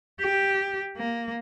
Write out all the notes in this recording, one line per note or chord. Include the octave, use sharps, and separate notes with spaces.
G4
A#3